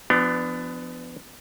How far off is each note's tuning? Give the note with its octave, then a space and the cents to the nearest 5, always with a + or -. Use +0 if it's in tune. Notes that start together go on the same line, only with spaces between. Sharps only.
F3 -25 B3 +25 D4 +15